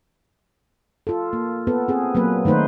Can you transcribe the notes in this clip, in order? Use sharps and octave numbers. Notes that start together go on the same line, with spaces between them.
F4 A4
A#3
B3 A4 B4
C4 G#4
F#3 A#3 B3 B4
D#3 A3 D#4 B4 C5